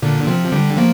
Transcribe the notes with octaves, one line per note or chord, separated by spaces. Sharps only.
A#2 D3
C3 F3
D3 G3
F3 A#3